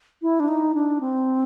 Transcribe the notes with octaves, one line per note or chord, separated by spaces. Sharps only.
E4
D4
D#4
D4
C4